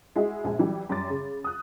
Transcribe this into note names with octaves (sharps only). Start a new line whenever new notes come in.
G#3 E4 F#4 G#4 D#5 E5
A#1 G#3 G#5
E3 F#3 G3
F#2 G3 D6 A6
C#3
D#6 F#6